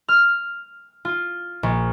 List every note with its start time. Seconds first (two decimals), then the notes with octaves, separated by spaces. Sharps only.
0.09 F6
1.05 F4
1.63 A#1